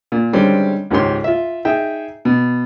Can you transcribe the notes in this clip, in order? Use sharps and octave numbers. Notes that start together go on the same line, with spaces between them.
A#2
D3 D#3 G3 G#3 C4 C#4
C#2 G#2 D#3 G4 C#5 C6
F4 E5
D#4 G#4 E5 G5
B2